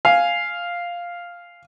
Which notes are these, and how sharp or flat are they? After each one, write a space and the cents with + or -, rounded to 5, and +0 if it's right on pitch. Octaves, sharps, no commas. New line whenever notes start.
F5 +0 G#5 +5